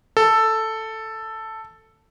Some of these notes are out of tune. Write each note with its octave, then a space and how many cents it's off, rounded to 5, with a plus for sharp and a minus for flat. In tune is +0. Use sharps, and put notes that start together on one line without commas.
A4 +5